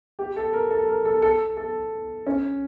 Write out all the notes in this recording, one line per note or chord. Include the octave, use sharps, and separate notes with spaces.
G4
A4
A#4
A4
A#4
A4
A4
A4
C#4